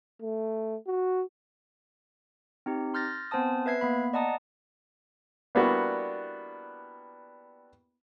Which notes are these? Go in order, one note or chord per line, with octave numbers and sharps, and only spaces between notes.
A3
F#4
C4 D#4 G4
C6 F6 G6 A6 A#6
B3 C4 C5 G#5 A5 D#6
B4 E5 G#6 C7
A#3 B3 B5
D5 D#5 F#5 A5 A#5 D#6
G3 A#3 B3 D4 E4 F#4